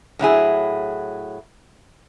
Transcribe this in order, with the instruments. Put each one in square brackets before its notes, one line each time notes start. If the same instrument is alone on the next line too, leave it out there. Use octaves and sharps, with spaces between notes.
[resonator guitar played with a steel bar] A2 F#3 E4 G#4